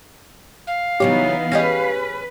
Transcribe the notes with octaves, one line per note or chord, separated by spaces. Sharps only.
F5
C#3 E3 F#3 B3 D#4 G4 C#5
C#4 G4 G#4 B4 D#5 A#6